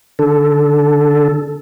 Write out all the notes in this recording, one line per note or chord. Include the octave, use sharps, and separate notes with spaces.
D3 A4